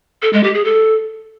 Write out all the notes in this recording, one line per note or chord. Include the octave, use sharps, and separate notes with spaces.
A4
G#3
G4
G#4
A4